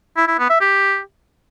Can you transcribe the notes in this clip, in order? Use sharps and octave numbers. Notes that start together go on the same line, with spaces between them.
E4
E4
B3
E5
G4